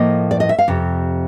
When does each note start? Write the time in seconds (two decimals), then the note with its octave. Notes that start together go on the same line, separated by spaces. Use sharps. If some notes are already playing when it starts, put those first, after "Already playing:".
Already playing: A2 F3 A#3 D#5
0.31 D5
0.40 D#5
0.49 E5
0.59 F5
0.68 F2 C3